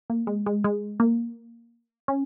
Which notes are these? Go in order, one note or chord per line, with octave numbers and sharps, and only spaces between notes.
A#3
G#3
G#3
G#3
A#3
C#4